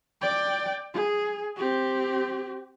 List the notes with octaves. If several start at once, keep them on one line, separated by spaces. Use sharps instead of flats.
D5 G5
G#4
C4 G4